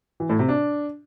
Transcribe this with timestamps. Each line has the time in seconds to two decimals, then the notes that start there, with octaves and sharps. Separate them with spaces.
0.20 E3
0.30 A2
0.39 C3
0.49 D4